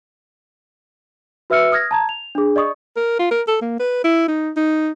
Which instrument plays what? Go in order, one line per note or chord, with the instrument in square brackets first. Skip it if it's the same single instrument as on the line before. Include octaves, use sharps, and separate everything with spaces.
[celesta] F#4 B4 E5 E6 F6 C#7
D#6 F6 G#6 A#6
A5 A#5 G#6
F7
D4 G#4
D5 D#5 C#6 D#6
[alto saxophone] A#4
F4
A#4
A4
A#3
B4
E4
D#4
D#4